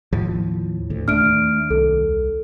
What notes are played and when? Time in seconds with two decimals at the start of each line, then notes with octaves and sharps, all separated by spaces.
0.13 D#2 A2 F3
0.90 D2
1.08 D#2 A3 D4 F6 D7
1.70 C2 A4